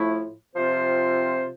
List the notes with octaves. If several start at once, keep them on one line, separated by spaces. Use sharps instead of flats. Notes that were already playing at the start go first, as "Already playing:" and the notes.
Already playing: A2 F3 A3 E4
C3 F3 C4 F4 C5